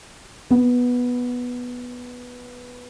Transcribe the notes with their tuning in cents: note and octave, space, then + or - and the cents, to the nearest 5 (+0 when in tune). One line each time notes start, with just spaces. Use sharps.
B3 -5